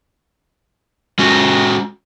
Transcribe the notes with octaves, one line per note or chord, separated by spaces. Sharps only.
G#3 C#4 F#4